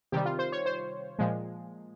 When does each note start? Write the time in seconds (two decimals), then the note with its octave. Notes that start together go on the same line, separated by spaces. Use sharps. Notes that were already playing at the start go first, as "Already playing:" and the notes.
0.12 C3 D#3 G3 G4
0.25 F4
0.39 C5
0.52 C#5
0.66 C5
1.19 A#2 F3 G#3